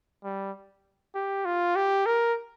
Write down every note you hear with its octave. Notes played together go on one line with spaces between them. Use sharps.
G3
G4
F4
G4
A#4